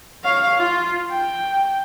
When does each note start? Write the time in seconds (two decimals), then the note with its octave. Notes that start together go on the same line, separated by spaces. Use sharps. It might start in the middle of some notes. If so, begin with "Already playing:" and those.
0.24 C#5 F5
0.55 F4
1.11 G5